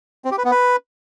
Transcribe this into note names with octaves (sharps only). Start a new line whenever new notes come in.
C4
G4
B4
B3
B4